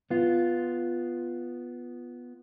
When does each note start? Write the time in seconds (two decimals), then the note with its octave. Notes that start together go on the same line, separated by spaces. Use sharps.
0.10 B3 F4